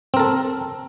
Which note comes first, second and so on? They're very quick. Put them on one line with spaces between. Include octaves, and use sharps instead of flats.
C4 A#4 A4